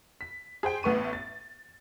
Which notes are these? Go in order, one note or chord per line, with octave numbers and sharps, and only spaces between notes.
B6
G#4 C5 G5
A1 A2 B3 C#6 D#7
A6